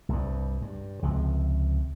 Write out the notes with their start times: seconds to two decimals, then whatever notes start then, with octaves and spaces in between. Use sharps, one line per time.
0.09 C2 G2
0.62 G2
1.03 C#2 C3 F3